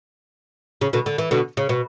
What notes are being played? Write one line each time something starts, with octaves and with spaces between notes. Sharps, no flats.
C#3
B2 D3
D3
E3
B2 D3
C#3
B2